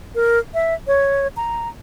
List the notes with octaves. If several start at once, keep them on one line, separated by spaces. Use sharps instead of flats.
A#4
E5
C#5
A#5